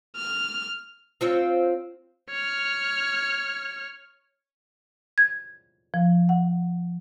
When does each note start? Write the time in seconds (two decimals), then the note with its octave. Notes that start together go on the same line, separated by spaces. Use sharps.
0.16 F6
1.21 C4 F4 C#5
2.30 C#5 F6
5.18 G#6
5.94 F3
6.29 F#5